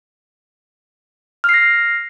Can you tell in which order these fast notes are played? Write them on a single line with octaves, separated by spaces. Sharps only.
F6 C7 A#6